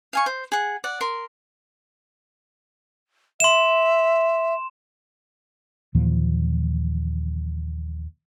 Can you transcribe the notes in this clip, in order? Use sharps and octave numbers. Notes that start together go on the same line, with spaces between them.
F5 G#5 C#6
C5
G#4 F#5
D5 F#5
A#4 C6
E5 C6 E7
D#2 A#2 E3 F3